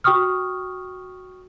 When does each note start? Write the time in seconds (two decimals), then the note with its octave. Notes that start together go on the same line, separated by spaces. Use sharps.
0.04 F#4 G5 C#6 D#6 F6